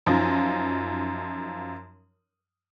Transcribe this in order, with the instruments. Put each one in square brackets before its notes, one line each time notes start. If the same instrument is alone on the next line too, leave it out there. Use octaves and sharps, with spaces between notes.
[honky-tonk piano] F#2 F3 D#4